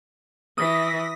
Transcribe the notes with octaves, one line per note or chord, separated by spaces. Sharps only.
E3 D#6 A#6 B6